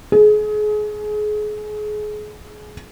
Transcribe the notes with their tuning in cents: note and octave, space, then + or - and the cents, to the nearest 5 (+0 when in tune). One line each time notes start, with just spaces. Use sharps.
G#4 +30